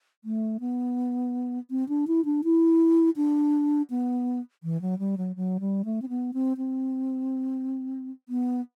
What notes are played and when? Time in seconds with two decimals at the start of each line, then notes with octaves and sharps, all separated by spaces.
0.24 A3
0.60 B3
1.70 C4
1.89 D4
2.08 E4
2.25 D4
2.44 E4
3.16 D4
3.90 B3
4.63 E3
4.82 F#3
4.99 G3
5.17 F#3
5.36 F#3
5.60 G3
5.85 A3
6.02 C4
6.09 B3
6.34 C4
6.57 C4
8.29 B3